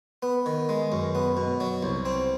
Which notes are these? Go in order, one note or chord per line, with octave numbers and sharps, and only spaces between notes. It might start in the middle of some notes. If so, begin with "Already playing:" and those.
B3
D#3
G#3
F#2
B3
B2
F#3
C2
C4